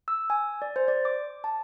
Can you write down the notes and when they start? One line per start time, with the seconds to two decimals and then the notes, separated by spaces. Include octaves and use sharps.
0.08 E6
0.30 G#5
0.62 D5
0.76 C5
0.88 D5
1.05 D6
1.44 A5